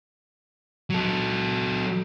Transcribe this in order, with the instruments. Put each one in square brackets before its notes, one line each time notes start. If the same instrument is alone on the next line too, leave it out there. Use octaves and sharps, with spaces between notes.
[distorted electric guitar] F#3 A4